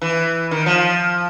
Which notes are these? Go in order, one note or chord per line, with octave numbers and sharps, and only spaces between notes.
E3
D#3
F3